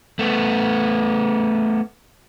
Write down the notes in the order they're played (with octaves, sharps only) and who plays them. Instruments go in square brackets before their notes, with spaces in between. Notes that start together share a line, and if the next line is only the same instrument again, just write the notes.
[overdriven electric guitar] A3 B3